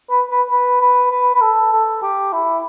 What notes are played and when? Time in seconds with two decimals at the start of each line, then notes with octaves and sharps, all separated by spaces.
0.10 B4
0.31 B4
0.50 B4
0.81 B4
1.11 B4
1.34 B4
1.41 A4
1.72 A4
2.02 G4
2.32 E4